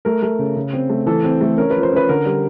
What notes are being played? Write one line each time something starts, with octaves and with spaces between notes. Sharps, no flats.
A3 A#4
A3
C#3
C#3
C4
A3
E3 A4
C4
A3
C#4 A#4
B4
F3
C5
C#4 B4
D3 A#4
G3